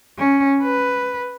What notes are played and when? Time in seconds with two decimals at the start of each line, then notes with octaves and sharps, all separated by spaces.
0.19 C#4
0.62 B4